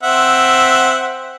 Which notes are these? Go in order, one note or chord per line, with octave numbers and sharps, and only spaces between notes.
C4 E5 F#5